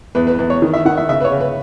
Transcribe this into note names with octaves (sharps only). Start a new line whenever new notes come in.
E2 B4
B4
E2 B4
C#5
D#3
E5
D#3 F#5
E5
C#3 E5
B4
C#5
C#3
B4